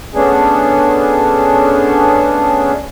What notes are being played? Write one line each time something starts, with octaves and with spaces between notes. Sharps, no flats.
A3 B3 C#4 D4 G#4